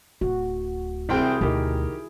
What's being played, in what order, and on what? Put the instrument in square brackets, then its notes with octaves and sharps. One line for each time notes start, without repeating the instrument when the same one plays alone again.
[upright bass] D1 [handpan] F#4
[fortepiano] C2 C4 G5 [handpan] E4 G#4
[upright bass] D2 B2 [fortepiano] D#3 G4 A#4